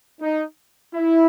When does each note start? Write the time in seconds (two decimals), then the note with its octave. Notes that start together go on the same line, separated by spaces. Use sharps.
0.21 D#4
0.94 E4